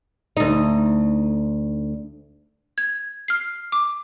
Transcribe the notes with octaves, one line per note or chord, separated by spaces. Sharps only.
D2 D#4
G#6
F6 C7
D6